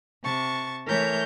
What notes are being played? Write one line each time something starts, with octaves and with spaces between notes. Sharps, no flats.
C3 A5 C#6
E3 A3 A#4 C#5 G6